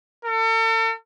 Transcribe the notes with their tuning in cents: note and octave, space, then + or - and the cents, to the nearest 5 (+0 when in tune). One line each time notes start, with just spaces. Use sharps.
A4 +40